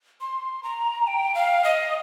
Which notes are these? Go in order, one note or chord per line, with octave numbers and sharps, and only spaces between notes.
C6
A#5
G5
F5
D#5